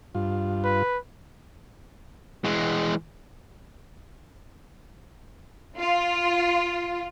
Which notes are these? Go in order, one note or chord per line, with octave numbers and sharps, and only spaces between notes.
G2 F4
B4
E3 G#3
F4